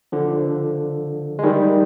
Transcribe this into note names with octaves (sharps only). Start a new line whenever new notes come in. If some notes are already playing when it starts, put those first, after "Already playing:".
D3 F3
G#3
D#3 G3